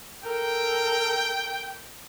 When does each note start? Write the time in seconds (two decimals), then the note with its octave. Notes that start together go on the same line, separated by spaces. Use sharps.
0.24 A4 A#4 G5